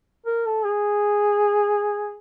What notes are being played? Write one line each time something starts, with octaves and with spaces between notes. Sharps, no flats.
A#4
A4
G#4